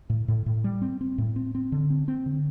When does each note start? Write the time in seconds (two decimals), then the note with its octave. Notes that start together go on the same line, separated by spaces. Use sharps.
0.10 A2
0.28 A2
0.46 A2
0.64 G3
0.82 C4
1.01 C4
1.18 A2
1.36 C4
1.55 C4
1.72 D3
1.90 C4
2.08 C4
2.26 D3